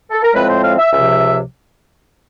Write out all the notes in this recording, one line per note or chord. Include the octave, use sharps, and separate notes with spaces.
A4
A#4
A2 F3 G#3 C4 B4
C5
F5
E5
C#2 C3 F3 E5